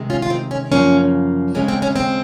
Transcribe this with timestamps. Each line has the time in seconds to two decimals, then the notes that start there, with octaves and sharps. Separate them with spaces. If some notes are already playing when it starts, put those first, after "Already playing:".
Already playing: C3 D#3 G#3
0.10 C#4 F4
0.22 F4
0.30 C4 D#4
0.51 C#4
0.72 F#2 C#3 F3 A#3 C#4
1.54 D#2 C#3 G#3 C#4
1.68 C4
1.82 C#4
1.96 C4